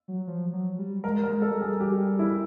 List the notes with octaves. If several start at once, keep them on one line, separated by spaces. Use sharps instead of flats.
F#3
F3
F#3
G3
G#3 A#4
A#4
G#3
A4
G3
G#4
G4
E4